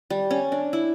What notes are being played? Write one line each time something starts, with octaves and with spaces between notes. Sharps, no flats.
G3
C#4
D4
E4